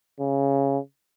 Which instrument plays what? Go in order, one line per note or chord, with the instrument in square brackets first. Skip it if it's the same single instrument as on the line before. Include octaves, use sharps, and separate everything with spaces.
[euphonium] C#3